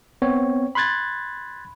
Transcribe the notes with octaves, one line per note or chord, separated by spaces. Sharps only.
B3 C4 C#5
B5 C6 F#6 G#6 A6